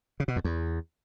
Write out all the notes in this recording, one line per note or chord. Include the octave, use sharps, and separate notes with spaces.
C#3
B2
F2
E2